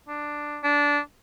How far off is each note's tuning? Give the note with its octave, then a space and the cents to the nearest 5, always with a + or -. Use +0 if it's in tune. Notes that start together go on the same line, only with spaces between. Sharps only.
D4 +5
D4 -15